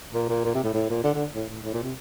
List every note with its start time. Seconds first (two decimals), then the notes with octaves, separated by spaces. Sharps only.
0.14 A#2
0.29 A#2
0.44 A#2
0.55 C3
0.64 A2
0.74 A2
0.89 A#2
1.04 D3
1.14 D3
1.34 A2
1.49 A2
1.63 A2
1.73 A#2
1.83 C3